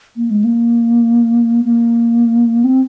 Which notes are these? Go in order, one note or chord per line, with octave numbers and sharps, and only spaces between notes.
A#3
G#3
A#3
A#3
C4